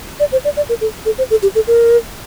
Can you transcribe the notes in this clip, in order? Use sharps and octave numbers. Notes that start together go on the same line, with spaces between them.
D5
C5
D5
D5
A#4
A4
A4
C5
A4
G4
A4
A#4